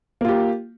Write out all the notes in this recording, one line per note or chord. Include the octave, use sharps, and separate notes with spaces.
A#3 F4 G4